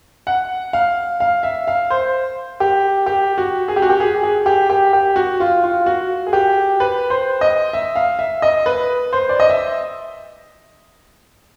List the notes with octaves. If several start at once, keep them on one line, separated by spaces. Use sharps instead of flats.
F#5
F5
F5
E5
F5
C5
G4
G4
F#4
G#4
G4
F#4
G4
G#4
G#4
G4
G4
G4
F#4
F4
F4
F#4
G#4
G4
B4
C5
D#5
E5
F5
E5
D#5
B4
C5
D5
D#5
E5